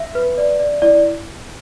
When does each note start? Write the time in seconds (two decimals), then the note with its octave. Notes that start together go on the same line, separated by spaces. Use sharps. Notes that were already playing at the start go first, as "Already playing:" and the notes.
Already playing: E5
0.15 B4
0.38 D5
0.59 D5
0.82 E4 D5